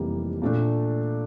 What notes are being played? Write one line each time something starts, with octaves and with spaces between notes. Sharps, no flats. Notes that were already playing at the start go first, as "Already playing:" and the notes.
Already playing: F1 F2 E3 G3 A#3
A#2 A3 D4